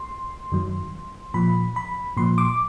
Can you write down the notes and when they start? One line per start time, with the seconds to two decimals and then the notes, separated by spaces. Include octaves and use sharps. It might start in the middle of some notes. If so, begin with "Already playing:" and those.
Already playing: C6
0.52 F#2 D#3 F#3
1.34 A#2 F3 B5
1.76 B5
2.17 A#2 F3 C6
2.38 D6